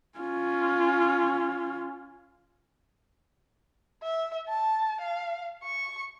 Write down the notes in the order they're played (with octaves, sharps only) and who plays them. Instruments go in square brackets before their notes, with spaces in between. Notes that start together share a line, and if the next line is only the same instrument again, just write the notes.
[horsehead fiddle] C#4 F4
[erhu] E5
A5
F5
C#6